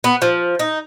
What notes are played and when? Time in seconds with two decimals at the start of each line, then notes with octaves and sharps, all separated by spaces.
0.04 B3
0.22 F3
0.59 D#4